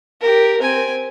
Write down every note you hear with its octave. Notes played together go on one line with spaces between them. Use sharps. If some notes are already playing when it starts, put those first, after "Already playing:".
G4 A#4
C4 G#5